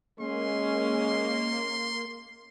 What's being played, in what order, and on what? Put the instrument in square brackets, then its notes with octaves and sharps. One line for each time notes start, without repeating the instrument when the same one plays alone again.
[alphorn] G#3 [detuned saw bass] A#3 [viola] C#4 [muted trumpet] C6